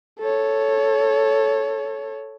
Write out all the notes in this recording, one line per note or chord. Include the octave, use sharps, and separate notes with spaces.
A4 C#5